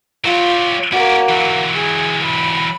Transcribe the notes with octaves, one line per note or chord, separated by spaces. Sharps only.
F#3 F4 G4
A#3 C#4 F#4 D5
E3 F#3
G#4
B5